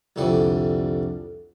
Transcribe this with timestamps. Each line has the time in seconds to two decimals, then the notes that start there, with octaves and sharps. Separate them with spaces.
0.16 C2 F2 D3 G3 D5